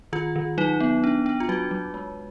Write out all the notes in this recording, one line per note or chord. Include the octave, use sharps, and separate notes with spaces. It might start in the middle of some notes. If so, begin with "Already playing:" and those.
D#3 F4
D#3
F#3 D#4
B3
D4
D4
F4
F#3 F#4
F#3
G#3